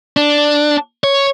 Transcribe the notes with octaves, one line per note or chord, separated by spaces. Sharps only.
D4
C#5